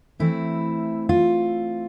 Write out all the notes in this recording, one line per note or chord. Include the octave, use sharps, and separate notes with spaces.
E3 A3 C4 E4
F4